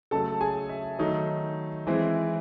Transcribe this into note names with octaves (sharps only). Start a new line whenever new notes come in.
C#3 F#3 A3 A4 A5
G#4 G#5
E5
D#3 F#3 A3 D#4
E3 G#3 C4 E4